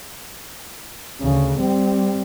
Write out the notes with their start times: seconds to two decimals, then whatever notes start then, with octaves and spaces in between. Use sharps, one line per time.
1.22 D2 C#3
1.60 G3 C4